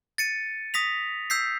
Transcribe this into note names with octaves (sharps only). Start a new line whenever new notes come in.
A6 C#7 D#7
D#6 A#6 B6 F7
E6 G6 B6 C7